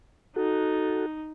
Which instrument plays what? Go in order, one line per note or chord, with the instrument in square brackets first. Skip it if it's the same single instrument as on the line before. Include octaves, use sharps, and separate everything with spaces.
[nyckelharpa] D#4 [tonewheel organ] F#4 A4